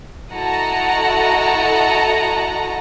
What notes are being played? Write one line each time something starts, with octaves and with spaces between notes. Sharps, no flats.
E4 F#4 A4 D#5 A5 A#5